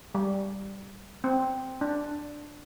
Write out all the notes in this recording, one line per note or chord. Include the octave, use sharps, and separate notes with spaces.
G3
C4
D4